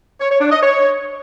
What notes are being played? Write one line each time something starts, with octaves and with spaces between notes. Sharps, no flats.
C#5
C#5
D4
D#5
C#5